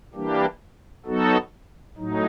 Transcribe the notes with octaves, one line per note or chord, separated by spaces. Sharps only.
E3 G3 A#3 D4 G4
F#3 B3 D#4 F#4 A4
A2 F#3 D#4